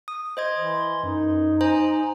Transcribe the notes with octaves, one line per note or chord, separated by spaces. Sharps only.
D#6
C5 D#5 C6 G#6
E3
F#2 D#4
C5 G#5 A#5